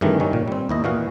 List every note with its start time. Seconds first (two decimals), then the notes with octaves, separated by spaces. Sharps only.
0.01 G2 C3 D#3 E3 G#3 A3
0.20 D#3 G3 C#4
0.33 A#2
0.48 G3 C4
0.69 D#2 E4 D#5
0.84 A#2 E3 F#4 F5